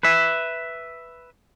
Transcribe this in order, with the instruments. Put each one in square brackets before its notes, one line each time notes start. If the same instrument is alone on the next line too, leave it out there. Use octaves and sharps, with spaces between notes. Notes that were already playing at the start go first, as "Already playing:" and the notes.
[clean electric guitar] B4 E5